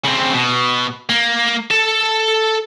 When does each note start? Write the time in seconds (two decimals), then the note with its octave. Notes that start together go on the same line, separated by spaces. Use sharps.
0.05 C#3 C4
0.34 B2
1.09 A#3
1.71 A4 A5